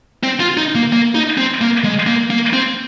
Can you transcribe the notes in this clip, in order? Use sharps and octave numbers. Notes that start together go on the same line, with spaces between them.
C4
F4
D#4
A#3
A#3
D#4
C4
A#3
G#3
A#3
A#3
C4